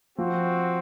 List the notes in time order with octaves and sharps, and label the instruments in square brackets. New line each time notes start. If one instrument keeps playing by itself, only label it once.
[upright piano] F3 [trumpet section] C4 F#4